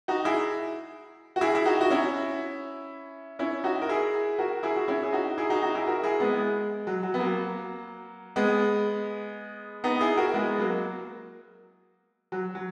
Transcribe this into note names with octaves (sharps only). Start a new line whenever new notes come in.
D#4 F#4
E4 G#4
F#4
E4 G#4
E4
D#4 F#4
F#4
C#4 E4
C#4 E4
D#4 F#4
A#4
E4 G#4
F#4 A#4
E4 G#4
F#4
C#4 E4
G#4
D#4 F#4
E4 G#4
D#4 F#4
D#4 F#4
E4 G#4
F#4 A#4
E4 G#4
G#3 B3
G#3
F#3
F#3
B3
F#3 A#3
G#3 B3
B3 D#4
E4 G#4
F#4 A#4
G#3 B3
F#3 A#3
F#3
F#3